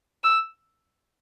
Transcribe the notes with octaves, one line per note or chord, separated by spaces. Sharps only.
E6